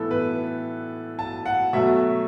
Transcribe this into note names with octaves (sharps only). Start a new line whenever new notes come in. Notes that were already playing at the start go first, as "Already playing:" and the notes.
Already playing: A2 E3 B3 A4
B4
A5
F#5
B2 F#3 A3 E5